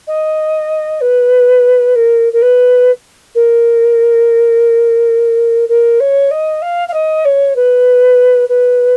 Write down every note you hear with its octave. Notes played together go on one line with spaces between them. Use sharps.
D#5
B4
A#4
A#4
B4
A#4
A#4
C#5
D#5
F5
F5
D#5
C#5
B4
B4